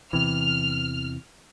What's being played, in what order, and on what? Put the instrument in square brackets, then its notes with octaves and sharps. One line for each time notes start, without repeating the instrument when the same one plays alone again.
[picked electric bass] E2 C3 E3 [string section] F6